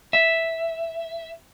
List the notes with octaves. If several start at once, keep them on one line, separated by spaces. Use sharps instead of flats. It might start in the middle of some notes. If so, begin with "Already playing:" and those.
E5